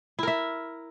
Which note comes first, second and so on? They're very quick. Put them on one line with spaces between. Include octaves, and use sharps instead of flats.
E4 A#4 E5